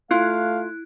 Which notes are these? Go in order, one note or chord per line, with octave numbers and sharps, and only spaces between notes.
A3 E4 F4 F5 F#6